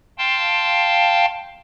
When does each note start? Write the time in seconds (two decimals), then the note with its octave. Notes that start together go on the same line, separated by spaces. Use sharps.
0.18 F5 G5 A5 C6